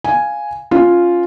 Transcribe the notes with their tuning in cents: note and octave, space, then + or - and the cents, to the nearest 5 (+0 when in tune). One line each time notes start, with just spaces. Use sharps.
F5 +0 G#5 +0
C#4 +0 F4 +0